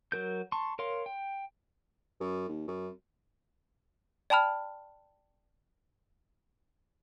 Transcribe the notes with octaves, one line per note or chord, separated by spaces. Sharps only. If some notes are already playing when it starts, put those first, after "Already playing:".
F#3 A#4 G6
A5 C6 C#6
A#4 C#5 F5 C6
G5
F#2
D#2
F#2
D5 G5 A5 B5 F6